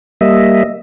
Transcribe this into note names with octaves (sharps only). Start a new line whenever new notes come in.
G3 A#3 D#5 E5